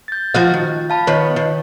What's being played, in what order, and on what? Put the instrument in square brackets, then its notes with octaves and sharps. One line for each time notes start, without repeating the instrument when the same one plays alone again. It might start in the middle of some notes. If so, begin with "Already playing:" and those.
[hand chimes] G6 A6
[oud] F3 F#4 F5
D#3
[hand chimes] F5 A5 B5
[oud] D#3 B3 [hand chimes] C#5
[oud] D#3